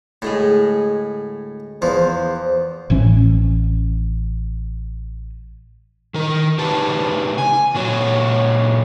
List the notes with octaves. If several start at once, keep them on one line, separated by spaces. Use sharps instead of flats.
D2 A2 G#3 G#4
E2 F3 C5
A1 A2 E3 C#4
D#3 A#4
C#3 D#4 G4 B4 A5
G#5
A#2 F#3 F#4 C#5